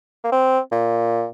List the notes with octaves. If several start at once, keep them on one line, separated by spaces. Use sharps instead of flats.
A#3
C4
A#2